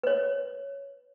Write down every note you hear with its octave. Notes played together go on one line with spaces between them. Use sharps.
B4 C#5